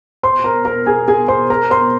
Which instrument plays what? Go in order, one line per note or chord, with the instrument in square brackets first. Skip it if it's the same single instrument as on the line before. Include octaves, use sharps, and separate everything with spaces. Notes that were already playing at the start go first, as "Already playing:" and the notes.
[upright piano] C5 C6
A#4 A#5
A#4 A#5
G#4 G#5
G#4 G#5
C5 C6
A#4 A#5
C5 C6